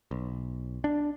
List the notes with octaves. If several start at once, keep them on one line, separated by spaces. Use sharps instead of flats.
B1
D4